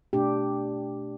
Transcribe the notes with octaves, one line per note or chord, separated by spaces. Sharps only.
B2 A3 D4 G4